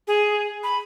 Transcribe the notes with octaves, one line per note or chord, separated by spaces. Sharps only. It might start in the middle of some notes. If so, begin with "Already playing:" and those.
G#4
B5